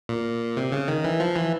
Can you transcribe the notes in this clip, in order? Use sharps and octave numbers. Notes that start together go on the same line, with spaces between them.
A#2
C3
C#3
D#3
E3
F3
E3